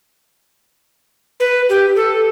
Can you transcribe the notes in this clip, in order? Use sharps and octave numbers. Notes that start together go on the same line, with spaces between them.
B4
G4
A4